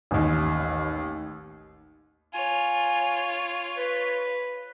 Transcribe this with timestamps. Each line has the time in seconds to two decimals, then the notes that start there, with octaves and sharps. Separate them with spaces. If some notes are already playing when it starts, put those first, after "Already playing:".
0.11 A1 D#2
2.34 F4 C#5 G#5
3.77 B4